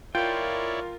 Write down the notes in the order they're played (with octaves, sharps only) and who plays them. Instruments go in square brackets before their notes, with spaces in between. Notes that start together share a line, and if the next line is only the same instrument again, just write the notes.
[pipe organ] E4 C#5 D5 [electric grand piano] F4 [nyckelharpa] A#4 [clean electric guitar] G5